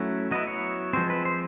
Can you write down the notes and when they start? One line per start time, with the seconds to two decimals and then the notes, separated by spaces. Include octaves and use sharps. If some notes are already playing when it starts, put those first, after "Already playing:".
Already playing: F#3 A3 C#4 E4
0.31 F#3 B3 E4 D#5
0.47 C#5
0.93 F3 G#3 C4 C5
1.10 B4
1.25 C5